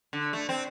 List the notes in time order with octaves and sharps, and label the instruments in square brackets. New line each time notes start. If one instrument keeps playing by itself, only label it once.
[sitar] D3
A3
C4